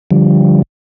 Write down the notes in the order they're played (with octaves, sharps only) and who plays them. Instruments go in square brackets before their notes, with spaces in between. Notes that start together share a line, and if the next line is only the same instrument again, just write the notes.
[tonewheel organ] D3 F3 G3